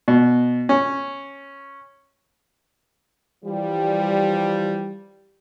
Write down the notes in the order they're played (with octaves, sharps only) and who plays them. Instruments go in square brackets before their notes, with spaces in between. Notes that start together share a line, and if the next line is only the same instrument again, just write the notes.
[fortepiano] B2
C#4
[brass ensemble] E3 F3 G3